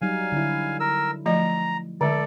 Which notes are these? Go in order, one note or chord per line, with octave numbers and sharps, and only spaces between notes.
F#3 G3 D#4 F5 G#5
D3 E4
A#4 E6
F3 A3 D#5 A#5
D3 G#3 A4 D5